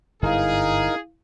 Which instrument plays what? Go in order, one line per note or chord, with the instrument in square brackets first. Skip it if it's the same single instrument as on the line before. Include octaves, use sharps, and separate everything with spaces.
[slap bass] G1 G#2 [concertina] D#4 A#4 [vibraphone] E4 F5 [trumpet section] G#4